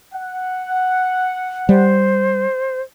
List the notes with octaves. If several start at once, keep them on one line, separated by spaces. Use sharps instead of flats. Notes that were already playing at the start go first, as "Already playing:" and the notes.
F#5
G3 C5